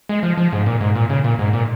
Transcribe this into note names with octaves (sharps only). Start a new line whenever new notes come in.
G#3
F3
F3
G#2
A#2
G#2
A#2
C#3
A#2
G#2
A#2